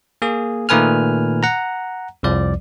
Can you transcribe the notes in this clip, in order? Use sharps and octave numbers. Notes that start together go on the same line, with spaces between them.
A#3 G#4
A#2 D#3 A3 B4 G#5 F6
F#5 A#5
C2 F2 F3 D5